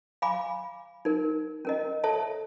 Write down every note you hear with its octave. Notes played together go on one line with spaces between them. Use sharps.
F5 G#5 B5 D6
D#4 A#4
C#4 A#4 D#5
A4 C#5 E5 A5